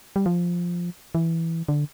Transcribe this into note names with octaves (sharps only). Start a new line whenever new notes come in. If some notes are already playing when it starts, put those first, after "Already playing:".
G3
F3
E3
D3